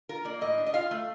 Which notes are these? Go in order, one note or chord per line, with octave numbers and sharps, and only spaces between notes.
F4 A#4
A#3 D5
A2 D#5
D4
D#5
F4 F5
A3